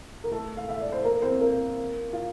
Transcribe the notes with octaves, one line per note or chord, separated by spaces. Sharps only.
A#4
A3 A4
F5
E5
D5
C5
A#3 A#4
C4 C5
A#3 A#4
F4